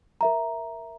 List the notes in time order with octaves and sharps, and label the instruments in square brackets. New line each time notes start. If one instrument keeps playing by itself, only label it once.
[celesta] A#4 E5 A#5